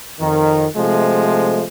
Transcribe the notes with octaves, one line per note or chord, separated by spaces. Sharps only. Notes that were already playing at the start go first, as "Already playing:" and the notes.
F2 D#3
C3 F3 G#3 A3